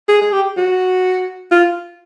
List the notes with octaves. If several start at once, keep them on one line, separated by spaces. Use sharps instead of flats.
G#4
G#4
G4
F#4
F4